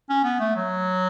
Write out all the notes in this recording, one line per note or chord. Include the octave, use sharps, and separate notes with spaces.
C#4
B3
A3
F#3